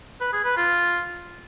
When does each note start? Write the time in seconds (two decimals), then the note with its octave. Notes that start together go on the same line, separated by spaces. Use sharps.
0.21 B4
0.33 G#4
0.44 B4
0.56 F4